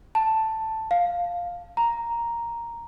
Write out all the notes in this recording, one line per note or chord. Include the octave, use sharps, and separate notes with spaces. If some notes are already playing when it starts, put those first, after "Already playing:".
A5
F5
A#5